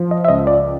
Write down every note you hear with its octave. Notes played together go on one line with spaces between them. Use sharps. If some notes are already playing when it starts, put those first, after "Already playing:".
Already playing: F3
D#5
E5
C#2 D#5
D5